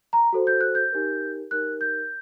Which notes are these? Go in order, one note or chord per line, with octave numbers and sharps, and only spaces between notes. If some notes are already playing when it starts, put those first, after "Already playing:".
A#5
F#4 A4 C5
G6
F#6
G6
D#4 G4 A#4
D#4 G4 A#4 F#6
G6